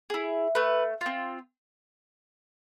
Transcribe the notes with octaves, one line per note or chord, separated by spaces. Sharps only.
E4 G#4
A3 B4
C4 F4